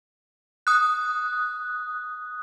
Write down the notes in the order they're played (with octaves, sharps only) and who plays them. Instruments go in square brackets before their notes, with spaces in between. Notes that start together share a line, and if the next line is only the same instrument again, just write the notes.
[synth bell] D#6 F#6